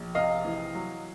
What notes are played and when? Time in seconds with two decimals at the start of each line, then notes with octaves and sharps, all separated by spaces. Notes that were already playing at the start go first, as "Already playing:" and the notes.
Already playing: A#1
0.15 C3 D#5 F5
0.45 E3
0.75 F#3